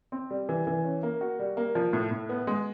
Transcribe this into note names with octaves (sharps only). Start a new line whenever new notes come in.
C4
G3
E3
E3
C#4
A#3
F#4
G3
A#3
F3
A2
A2
B3
G#3